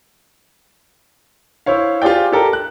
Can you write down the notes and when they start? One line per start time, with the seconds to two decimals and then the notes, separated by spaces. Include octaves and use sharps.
1.66 E4 C5 C#5 F5
2.02 F4 G4 G#4 C5 D5 G5
2.32 G4 A4 A#4
2.53 F#6